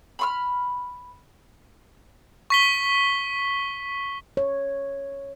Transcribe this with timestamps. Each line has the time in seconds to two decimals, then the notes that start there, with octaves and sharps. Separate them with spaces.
0.19 B5 C6 F6
2.50 C#6 B6 G7
4.37 C#5